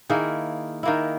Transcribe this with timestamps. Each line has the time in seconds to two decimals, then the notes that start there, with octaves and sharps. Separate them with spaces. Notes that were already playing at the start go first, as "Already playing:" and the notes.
0.09 D#3 A#3 E4 G#4
0.83 D#3 A#3 E4